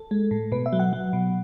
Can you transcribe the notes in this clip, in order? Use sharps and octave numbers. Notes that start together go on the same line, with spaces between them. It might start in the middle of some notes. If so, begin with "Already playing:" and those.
Already playing: A4
G#3
A2
B2 B4
E5
F#3
F#5
F#3
B2